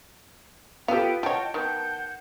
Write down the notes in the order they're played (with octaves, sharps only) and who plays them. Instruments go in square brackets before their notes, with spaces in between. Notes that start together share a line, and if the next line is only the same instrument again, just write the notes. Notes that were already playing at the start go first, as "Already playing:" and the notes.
[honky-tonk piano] B3 G4 [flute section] F4 G5 [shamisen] A4 F5
[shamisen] F4 C#5 [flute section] D#5 F#5 [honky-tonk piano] G5 A5
[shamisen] D#3 B3 [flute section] F#5 G6